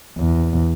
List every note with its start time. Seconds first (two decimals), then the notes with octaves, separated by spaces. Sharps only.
0.18 E2